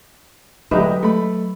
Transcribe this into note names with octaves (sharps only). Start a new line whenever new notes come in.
D2 F#3 D#4 G4 B4 E5
A3 B5